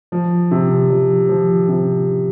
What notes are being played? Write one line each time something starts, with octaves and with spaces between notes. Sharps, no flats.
F3
C3
F3
F3
C3